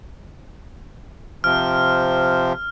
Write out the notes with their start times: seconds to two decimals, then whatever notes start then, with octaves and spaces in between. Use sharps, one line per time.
1.44 C3 F3 F6